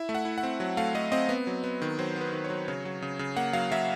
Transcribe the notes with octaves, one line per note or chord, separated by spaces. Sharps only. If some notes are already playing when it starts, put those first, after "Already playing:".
Already playing: E4 E5
A3
F#5
E4
F#5
C4
F#3
A3 F5
A3 D#5
C4 D#5
B3
F#3
B3
D#3
F#3 C5
B3 B4
D#3
C#5
F#3
C#3 C#5
F#3
C#3
C#3
A#3 F#5
F#3 F5
F#3 E5